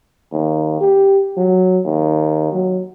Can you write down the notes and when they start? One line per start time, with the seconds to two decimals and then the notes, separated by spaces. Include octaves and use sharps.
0.32 D#2
0.81 G4
1.37 F#3
1.84 D#2
2.53 F#3